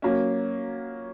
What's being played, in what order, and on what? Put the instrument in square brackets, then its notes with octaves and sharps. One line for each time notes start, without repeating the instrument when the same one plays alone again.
[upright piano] F#3 A#3 C#4